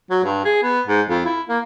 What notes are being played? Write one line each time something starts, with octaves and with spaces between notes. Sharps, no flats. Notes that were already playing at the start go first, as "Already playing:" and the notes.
F#3
G2
G#4
B3
G#2
F2
E4
A#3